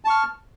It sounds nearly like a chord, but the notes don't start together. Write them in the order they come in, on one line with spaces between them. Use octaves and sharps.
A5 C#6 F6